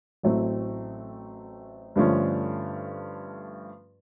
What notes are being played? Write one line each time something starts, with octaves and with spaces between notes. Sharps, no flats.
A1 A2 F#3 A3 C4
G2 D3 F3 A3 C#4